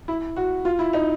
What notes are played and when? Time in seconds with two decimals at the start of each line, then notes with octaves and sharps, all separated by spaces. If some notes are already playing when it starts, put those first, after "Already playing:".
0.08 E4
0.36 F#4
0.65 F4
0.79 E4
0.93 D#4